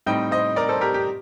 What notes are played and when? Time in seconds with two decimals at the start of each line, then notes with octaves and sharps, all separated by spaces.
0.06 A2 G3 C4 D#4 D#5 G5
0.31 C5 D#5
0.56 A#4 D5
0.68 A4 C5
0.81 G4 A#4
0.94 G4